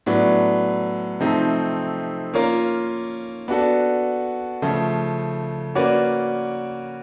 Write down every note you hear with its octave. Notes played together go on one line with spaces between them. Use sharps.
A2 F#3 B3 D4
C3 F3 A3 C4 D#4
A#3 C#4 F4 A#4
B3 D4 F#4 A4
C#3 F3 A3
A#3 C#4 F#4 B4 D5